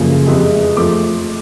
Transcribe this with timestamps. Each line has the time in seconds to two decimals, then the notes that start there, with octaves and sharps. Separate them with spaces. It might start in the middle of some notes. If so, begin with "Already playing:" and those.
Already playing: F#2 C#3 F3 A#3
0.27 F2 C3 E3 G#3
0.77 F3 A3 D6